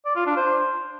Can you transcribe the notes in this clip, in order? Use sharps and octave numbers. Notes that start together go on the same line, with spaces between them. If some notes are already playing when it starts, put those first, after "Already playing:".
D5
F4
D4
C5